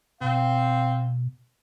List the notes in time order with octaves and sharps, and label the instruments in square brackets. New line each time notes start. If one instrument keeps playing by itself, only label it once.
[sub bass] B2 [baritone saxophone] C4 [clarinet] F5